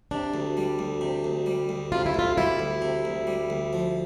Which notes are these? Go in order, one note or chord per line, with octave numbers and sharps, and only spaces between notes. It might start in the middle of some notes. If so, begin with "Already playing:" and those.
C3 D4
D2
G3
D2
C3
D2
G3
D2
C3 F4
E4
D2 F4
G3 E4
D2
C3
D2
G3
D2
F3